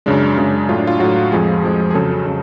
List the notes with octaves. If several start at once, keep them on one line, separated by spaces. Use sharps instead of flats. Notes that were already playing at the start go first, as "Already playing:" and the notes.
F#2 C#3 G#3 D4
F#2 C#3 G#3
A2 F#3 F4
D4
F4
A2 F#3 F#4
F2 F3 G#3 G#4
F2 F3 G#3
G#4
F2 C#3 F#3 A4
C#3